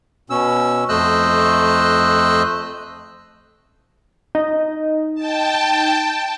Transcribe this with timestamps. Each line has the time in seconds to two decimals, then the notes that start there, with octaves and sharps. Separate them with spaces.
0.30 B2 C#4 E6
0.89 F2 A3 C5 D#5 E6 F#6
4.35 D#4
5.15 G5 A5